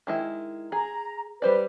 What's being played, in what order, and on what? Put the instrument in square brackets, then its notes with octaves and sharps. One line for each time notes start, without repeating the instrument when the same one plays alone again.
[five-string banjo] D#3 G#3 E4
[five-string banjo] G#4 [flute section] A#5
[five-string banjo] G3 C5 D5 [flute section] B4